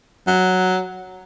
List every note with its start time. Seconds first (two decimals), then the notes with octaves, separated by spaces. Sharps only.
0.28 F#3